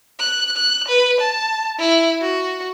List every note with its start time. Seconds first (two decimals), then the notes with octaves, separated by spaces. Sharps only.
0.19 F#6
0.57 F#6
0.88 B4
1.20 A5
1.79 E4
2.21 F#4